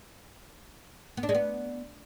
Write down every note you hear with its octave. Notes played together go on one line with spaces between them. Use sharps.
B3
D4
G#3
B3